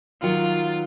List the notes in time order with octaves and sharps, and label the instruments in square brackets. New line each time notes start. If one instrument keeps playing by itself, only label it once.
[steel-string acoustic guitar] D#3 F#3 [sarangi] F4